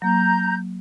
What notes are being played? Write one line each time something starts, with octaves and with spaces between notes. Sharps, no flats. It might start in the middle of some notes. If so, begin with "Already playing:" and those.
F#3 A#3 A#5 G6